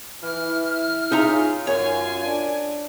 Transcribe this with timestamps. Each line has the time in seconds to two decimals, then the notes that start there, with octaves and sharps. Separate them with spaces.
0.23 E3 E4 F6
1.12 C#4 D#4 F4 G#4 E5 A#5
1.67 F#2 C#5 G#5
2.24 D4